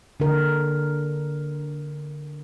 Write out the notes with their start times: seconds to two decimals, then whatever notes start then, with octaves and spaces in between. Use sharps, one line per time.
0.20 D3 A#4